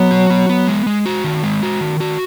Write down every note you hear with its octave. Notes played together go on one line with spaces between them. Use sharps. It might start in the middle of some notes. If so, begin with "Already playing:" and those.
Already playing: F#3 B3
F#4
B3
B3
G#3
G#3
F#4
D#3
G#3
F#4
D#3
F#4